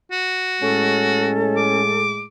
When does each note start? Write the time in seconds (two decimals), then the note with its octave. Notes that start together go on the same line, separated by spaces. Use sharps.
0.12 F#4
0.61 A2 G#3 C#4 A4
1.57 D6